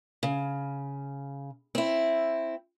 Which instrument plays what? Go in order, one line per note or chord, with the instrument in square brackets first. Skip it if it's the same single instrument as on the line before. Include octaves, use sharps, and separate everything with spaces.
[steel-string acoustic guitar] C#3
C4 E4